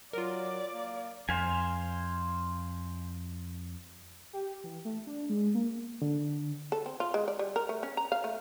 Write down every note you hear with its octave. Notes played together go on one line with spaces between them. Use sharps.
F#3 F4 A#4 D5
A#3
F2 C5 F5 G#5
G4
E3
A3
D4
G#3
A#3
D3
A4
C4
F4
G#3
D5
G3
A#4
A3
C#4
A#5
F5
A3